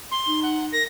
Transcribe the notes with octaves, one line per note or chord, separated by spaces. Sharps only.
C6
D#4
F#5
A#4 A#6